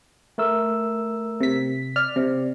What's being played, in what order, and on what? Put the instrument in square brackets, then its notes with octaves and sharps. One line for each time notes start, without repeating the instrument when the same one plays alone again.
[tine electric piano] A3 A#4 E6
[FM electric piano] C3 B6
[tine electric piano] D5 [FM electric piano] F6
[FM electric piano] C3